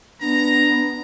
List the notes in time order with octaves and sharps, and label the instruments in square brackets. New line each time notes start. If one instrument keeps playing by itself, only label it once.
[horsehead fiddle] B3 [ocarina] D4 [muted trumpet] A#5